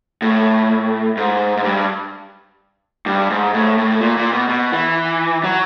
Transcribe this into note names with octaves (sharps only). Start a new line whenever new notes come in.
A2
G#2
G#2
G2
G2
G#2
A2
A2
A#2
A#2
B2
B2
E3
F#3